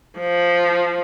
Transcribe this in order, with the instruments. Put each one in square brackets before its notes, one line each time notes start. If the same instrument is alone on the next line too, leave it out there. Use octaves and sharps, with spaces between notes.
[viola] F3